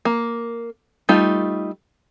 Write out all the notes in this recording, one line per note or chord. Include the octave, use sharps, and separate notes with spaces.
A#3
G3 A3 D#4 F4